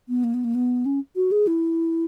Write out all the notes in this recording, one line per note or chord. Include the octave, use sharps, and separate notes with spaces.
B3
A#3
B3
A#3
B3
C#4
F#4
G#4
E4